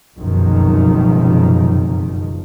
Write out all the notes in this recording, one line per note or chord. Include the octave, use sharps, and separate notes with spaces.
F1 C#2 F#2 B2 D#3 F3